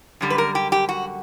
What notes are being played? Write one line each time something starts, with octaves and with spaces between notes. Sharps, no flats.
F#2 D3 G3
B4
A#4
G4
G4
F#4